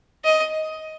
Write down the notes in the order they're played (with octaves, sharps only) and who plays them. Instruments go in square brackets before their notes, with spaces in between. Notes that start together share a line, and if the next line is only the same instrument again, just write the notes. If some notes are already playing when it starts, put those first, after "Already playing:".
[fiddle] D#5